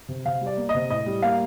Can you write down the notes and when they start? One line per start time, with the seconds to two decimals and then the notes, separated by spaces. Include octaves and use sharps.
0.09 C3
0.26 C3 F5
0.41 G3
0.47 D5
0.57 A#3
0.69 D#5
0.74 C3
0.90 A2 D#5
1.06 G3
1.22 A#3 F5